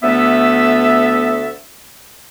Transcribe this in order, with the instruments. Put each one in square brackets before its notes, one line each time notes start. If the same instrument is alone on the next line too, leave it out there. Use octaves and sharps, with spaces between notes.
[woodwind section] D2 A3 B3 A4 E5